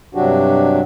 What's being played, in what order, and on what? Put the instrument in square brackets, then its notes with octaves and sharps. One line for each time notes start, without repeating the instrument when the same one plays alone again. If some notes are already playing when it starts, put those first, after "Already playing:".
[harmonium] G2 C3 F#3 D4 F#4 G4